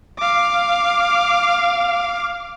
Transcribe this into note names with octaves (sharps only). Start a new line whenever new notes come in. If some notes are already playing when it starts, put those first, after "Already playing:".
F5 D6